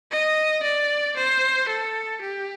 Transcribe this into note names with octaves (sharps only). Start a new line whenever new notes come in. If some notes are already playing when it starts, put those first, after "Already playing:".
D#5
D5
C5
A4
G4